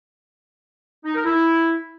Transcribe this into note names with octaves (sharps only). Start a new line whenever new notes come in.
D#4
A#4
E4